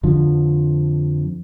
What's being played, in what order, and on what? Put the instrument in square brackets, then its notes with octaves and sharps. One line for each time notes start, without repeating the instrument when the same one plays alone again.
[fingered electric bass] F2 D3 F3